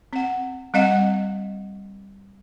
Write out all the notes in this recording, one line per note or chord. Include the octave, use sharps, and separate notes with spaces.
C4 F#5
G3 C4 D#5 F5 F#5